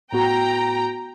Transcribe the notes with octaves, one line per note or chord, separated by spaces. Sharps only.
A2 B3 F#4 G5 A#5